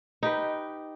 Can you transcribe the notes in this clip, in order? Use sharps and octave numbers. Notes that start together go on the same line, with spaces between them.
D#4 G4 B4